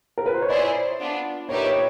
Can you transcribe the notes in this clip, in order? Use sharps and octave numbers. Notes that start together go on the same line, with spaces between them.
A#4
B4
C5
C#5
E4 G#4 C5 D5
B3 D4 F4
A#3 D#4 G4 B4 C#5 E5
C#5